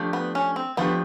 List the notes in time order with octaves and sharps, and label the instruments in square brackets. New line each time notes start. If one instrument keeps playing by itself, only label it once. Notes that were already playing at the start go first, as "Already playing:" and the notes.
Already playing: [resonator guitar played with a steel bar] F3 A3 D4 G4
[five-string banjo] B3
C#4
C4
[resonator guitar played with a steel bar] F3 A3 D4 G4 [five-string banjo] B3